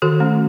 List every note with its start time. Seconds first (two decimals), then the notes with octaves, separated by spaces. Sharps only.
0.02 D#3 F#4 A4
0.20 A3 C#4